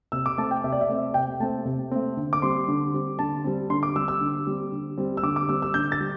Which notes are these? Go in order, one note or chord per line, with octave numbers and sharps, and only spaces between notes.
C3 E6
D6
A3 C4 A5
G5
C3 E5
D5
E5
A3 C4
E5
C3 G5
A3 C4 A5
C3
A3 C4
D3
D6
G3 C4 C6
D3
G3 C4
D3 A5
G3 C4
D3 C6
D6
G3 C4 E6
E6
D3
G3 C4
D3
G3 C4
E6
D3 D6
D6
G3 C4 E6
E6
D3 G6
A6
G3